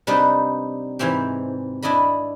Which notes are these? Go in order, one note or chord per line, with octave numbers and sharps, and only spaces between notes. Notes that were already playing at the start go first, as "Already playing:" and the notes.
C3 G3 D4 D#4 B4 D5
G#2 C3 E3 C4 G4
D4 E4 D5 D#5 B5